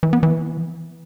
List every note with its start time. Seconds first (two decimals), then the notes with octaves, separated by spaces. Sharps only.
0.03 E3
0.13 B3
0.23 E3